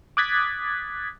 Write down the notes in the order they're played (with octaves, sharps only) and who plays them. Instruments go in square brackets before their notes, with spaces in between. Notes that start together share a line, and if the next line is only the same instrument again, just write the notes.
[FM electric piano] D6 D#6 F#6 G#6 A6 B6